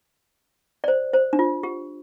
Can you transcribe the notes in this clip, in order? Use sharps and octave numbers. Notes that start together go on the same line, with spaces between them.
D5
C5
C5
D4
F4
G4